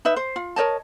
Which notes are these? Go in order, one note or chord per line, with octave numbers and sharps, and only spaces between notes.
D#4 B4 E5
C5
F4
A#4 C#5 D#5 A5